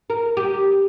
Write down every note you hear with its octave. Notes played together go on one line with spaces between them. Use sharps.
A#4
G4